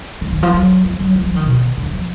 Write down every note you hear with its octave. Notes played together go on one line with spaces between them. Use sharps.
D#3
D#3
F3
F#3
F3
F#3
F3
F3
D#3
B2
D3
F3